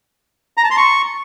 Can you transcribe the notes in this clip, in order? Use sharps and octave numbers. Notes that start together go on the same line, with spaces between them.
A#5
A5
C6
C#6